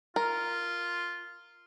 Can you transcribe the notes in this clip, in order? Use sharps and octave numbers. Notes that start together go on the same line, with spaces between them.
F4 A#4